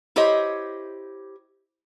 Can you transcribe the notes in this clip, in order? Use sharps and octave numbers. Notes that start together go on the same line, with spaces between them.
E4 G4 C5 C#5 D#5